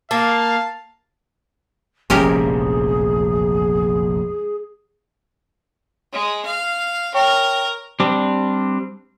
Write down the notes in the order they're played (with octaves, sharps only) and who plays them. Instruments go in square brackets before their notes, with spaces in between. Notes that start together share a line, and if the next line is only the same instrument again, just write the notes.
[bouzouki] A#3 [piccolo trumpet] F5 [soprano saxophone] A5
[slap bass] F1 A#1 E2 [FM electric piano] G#3 [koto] C#4 G4 A#4 [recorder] G#4
[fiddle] G#3
F5
[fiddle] A#4 [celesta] C#5 G5 C#6
[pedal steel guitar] G3 C4 D4